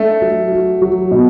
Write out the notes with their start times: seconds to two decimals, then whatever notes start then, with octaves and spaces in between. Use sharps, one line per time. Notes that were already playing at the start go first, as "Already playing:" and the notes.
Already playing: A3 D4
0.22 F#3
0.52 F#4
0.82 F#3
1.11 B2